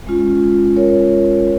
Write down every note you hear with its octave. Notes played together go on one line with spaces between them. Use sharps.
G#3 C#4 F4
A#4 C#5